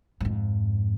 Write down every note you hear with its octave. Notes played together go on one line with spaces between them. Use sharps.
F2 G#2